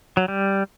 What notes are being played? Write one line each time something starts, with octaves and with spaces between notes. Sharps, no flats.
F#3
G3